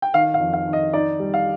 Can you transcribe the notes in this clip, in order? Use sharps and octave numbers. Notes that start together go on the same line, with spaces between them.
G5
D#3 F5
F5
F2
F5
D#3
D#5
D#4 D5
G3
F5